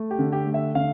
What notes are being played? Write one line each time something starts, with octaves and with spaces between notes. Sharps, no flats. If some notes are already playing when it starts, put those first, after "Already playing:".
Already playing: A3
G4
D3
G4
A3
E5
D3 F5